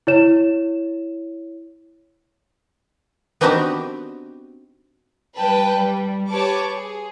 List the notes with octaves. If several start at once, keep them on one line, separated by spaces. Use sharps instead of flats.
E4 C#5 E7
B3 C4 D4 D#4 F#4 G4
G3 B4 G5 A5
G3
G4 B4 C#5 A5 C#6 D6
G#4